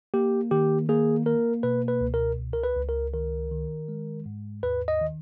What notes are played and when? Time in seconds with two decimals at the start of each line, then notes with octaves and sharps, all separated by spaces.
0.14 A#3 G4
0.51 D#3 G4
0.89 A#3 G#4
1.26 A#3 A#4
1.63 B2 B4
1.88 B4
2.01 C#2
2.14 A#4
2.39 C#2
2.53 A#4
2.64 B4
2.76 C#2
2.89 A#4
3.13 D#3 A#4
3.51 D#3
3.88 G#3
4.26 G#2
4.63 D#2 B4
4.88 D#5
5.01 D#3